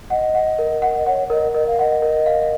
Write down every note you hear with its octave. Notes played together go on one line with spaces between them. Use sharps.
D#5 F#5
F#5
A#4
F#5
D#5
C#5 F#5
A#4 D#5
A#4 D#5
F5
D#5 F#5
A#4
F5